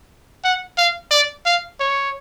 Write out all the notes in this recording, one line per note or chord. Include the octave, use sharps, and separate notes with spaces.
F#5
F5
D5
F5
C#5